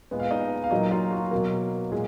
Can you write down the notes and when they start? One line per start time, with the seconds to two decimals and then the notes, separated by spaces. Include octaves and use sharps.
0.11 A#2 G#3 B3
0.20 F5
0.31 D#4 D#5
0.64 F5
0.71 A#2 F#3 A#3 D#4 D#5
0.91 F4 F5
1.11 F#4
1.31 B2 F#3 A#3
1.92 A#2 G#3 G#4